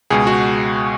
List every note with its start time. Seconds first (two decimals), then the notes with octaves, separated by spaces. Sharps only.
0.10 C#2 B2 G#3 G#4
0.27 F#4